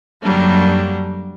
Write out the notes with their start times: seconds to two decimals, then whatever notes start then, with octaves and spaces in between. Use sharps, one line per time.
0.23 F#2 D3 F#3 G3 A#3 D4